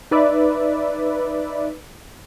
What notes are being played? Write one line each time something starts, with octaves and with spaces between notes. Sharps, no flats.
D#4 B4 D5 E5